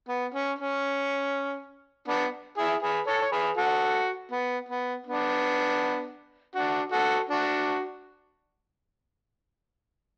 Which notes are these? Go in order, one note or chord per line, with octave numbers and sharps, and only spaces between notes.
B3
C#4
C#4
B3 D4
E4 G#4
G#4 B4
A4 C#5
C#5
G#4 B4
F#4 A4
B3
B3
B3 D4
D4 F#4
F#4 A4
D4 F#4